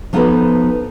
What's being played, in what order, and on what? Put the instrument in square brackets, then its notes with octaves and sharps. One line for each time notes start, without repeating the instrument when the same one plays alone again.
[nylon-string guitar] F3 B3 D#4 F#4 A4 B4